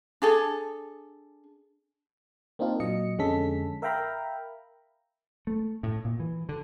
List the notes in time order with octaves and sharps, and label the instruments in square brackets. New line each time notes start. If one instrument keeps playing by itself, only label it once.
[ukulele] D4 G#4 A4
[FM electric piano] A#3 C4 D4 D#4 F4
A#2 F#3 D#5 C#7
F2 D3 G#3 C#4 A4 B6
A#4 E5 F5 G5 A#5 B5
[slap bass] A3
A2
A#2
E3
D3